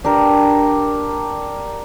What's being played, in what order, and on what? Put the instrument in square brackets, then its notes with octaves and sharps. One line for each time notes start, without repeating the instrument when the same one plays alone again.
[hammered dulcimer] D4 G4 A#4